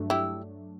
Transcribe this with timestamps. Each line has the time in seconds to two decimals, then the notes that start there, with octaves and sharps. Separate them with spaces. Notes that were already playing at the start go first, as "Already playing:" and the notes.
Already playing: G2 F#3 A3 D4
0.10 E4 G4